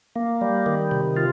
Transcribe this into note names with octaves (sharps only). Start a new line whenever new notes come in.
A#3
G3
D#3
C3
F4